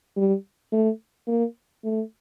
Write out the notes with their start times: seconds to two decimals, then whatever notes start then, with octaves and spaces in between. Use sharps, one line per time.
0.17 G3
0.73 A3
1.27 A#3
1.84 A3